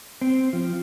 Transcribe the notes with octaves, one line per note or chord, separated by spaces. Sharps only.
C4
F3